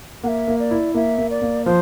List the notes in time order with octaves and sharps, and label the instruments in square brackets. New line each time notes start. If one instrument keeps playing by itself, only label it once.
[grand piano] A#3 [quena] F#5
[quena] E5
[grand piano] A#3
[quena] D5
[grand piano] E4
[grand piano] A#3 [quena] E5
[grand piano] A#3
[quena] D5
[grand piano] A#3
[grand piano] F3 [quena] C5